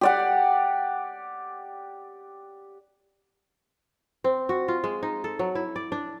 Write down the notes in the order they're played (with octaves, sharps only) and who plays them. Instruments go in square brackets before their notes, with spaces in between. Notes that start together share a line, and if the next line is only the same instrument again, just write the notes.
[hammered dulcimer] G4 D5 F#5
[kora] C4
F#4
F4
G#3
D#4
A4
F#3
E4
D5
D4